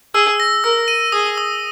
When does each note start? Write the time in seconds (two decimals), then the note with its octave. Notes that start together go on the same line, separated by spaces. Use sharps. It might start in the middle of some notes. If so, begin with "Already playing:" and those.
0.14 G#4 E6
0.40 A#6
0.64 A#4 E6
0.88 D#7
1.12 G#4 D#6
1.38 D#6